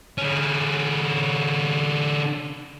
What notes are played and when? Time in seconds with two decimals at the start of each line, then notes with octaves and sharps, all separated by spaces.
0.18 D3 C#4